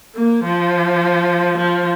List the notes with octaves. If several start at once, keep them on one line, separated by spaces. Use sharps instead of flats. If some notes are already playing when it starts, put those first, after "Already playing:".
A#3
F3
F3